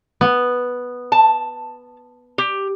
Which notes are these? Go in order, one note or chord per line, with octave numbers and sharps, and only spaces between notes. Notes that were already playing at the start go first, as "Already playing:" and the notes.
B3
A5
G4